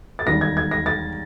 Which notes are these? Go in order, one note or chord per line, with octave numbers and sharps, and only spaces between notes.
A6
E1 D#2 D#3 G3 A#6
G#6
G#6
A#6
A6